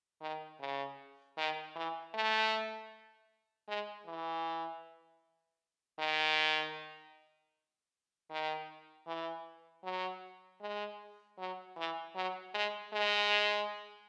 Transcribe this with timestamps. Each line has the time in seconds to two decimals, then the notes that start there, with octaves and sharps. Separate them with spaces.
0.21 D#3
0.60 C#3
1.37 D#3
1.75 E3
2.14 A3
3.68 G#3
4.06 E3
5.99 D#3
8.30 D#3
9.07 E3
9.84 F#3
10.61 G#3
11.39 F#3
11.77 E3
12.15 F#3
12.54 G#3
12.93 G#3